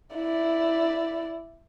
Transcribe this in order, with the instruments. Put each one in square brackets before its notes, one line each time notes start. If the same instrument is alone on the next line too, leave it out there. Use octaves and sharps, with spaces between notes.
[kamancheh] E4 D5